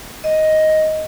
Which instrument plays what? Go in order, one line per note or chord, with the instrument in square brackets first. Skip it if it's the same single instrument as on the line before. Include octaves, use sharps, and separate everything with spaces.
[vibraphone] D#5